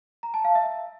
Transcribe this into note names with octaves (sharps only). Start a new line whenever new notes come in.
A#5
A5
F5
E5